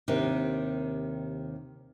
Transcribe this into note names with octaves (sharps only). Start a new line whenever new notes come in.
D#2 C3 D#3 D4